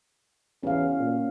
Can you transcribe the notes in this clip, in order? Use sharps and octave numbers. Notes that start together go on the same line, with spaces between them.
E2 C#4 F#4 F5
A#2